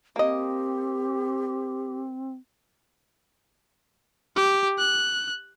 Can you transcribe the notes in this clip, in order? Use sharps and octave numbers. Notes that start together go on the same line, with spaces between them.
A#3 C4 G4 D#5
G4
F#6